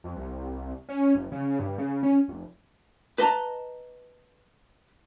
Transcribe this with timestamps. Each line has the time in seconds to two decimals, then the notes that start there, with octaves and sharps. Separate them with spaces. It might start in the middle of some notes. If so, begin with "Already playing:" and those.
0.04 F2
0.16 C2
0.89 C#4
1.15 F#1
1.32 C#3
1.59 G2
1.78 C#3
2.03 C#4
2.28 F1
3.18 B4 D#5 A5 A#5